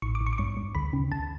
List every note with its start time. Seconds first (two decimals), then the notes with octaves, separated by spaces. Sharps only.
0.02 A1 C#6
0.15 D6
0.21 A1
0.27 C#6
0.33 D6
0.38 G2 C#6
0.57 G2
0.75 D2 B5
0.93 C#3
1.12 D2 A5